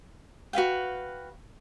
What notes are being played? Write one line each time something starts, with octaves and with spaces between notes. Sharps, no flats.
F#4 B4 F5 G5